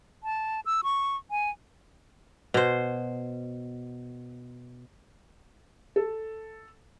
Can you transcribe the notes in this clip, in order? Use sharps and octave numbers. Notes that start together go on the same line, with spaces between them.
A5
E6
C#6
G#5
B2 C5
A4